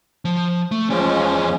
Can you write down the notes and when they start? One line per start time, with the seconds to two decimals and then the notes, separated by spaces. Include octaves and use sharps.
0.25 F3
0.71 A3
0.89 E2 F3 G#3 C#4 D5